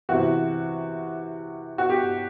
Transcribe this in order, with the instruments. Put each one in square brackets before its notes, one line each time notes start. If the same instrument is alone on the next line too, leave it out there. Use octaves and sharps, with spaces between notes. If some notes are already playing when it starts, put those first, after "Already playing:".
[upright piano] C3 E3 F#4
F#4
G4